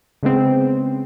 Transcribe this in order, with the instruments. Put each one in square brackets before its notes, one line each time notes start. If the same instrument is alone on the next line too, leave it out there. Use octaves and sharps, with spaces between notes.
[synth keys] C#3 G#3 B3 C4